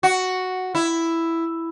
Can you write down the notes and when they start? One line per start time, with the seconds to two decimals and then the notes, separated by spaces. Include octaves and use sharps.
0.03 F#4
0.75 E4